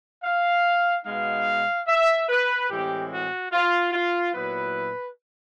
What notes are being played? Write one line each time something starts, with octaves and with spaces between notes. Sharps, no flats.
F5
B2 G#3 B3 D#4 F5
E5
B4
A2 E3 G#3 C4 G4
F#4
F4
F4
A#2 F#3 B3 E4 B4